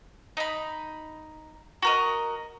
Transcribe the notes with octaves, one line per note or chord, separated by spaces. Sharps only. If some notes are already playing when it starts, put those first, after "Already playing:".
D#4 B5
F#4 A#4 D#5